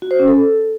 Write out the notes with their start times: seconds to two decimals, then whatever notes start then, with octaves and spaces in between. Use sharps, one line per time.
0.02 F#4
0.11 C5
0.19 C#4
0.28 A4